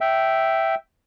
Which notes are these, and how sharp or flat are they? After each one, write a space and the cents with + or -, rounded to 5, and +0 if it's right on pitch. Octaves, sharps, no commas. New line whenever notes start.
E5 +0 G5 -10